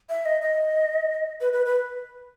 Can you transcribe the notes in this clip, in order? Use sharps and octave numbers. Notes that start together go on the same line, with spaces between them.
E5
D#5
D#5
B4
B4
B4